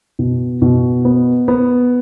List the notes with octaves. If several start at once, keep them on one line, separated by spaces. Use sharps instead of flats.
B2
B2
B3
B3